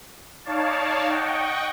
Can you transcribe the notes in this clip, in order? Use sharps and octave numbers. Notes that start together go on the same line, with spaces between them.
D#4 C#5 D5 F5 A5
D#5 F#5 G5 C#6